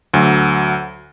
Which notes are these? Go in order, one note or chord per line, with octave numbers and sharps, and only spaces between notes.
D2 F#3